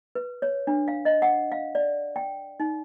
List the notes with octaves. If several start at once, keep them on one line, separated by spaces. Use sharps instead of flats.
B4
C#5
D4
F5
D#5
F#5
F5
D5
G5
D#4